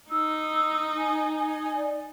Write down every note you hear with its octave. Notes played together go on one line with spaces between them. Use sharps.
D#4 E6
G#5
G#5
D5